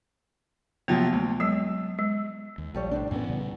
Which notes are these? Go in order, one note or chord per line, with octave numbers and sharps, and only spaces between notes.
C3 F3 F#3 A#3 B3
D2
F#3 G#3 E6
G#3
D#2
A#1 F3 G3 C#5
A2 C3 D4
F#2 A2 E3 B3 C#4
A#2 C#3 G3